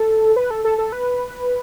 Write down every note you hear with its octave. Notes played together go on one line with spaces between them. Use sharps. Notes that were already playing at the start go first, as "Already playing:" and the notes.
Already playing: A4
B4
A4
A4
A4
B4